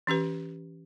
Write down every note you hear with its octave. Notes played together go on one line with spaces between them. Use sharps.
E3 C#4 G4 B4